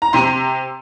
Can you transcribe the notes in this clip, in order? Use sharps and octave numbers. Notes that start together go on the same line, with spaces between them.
A#5
C3 C6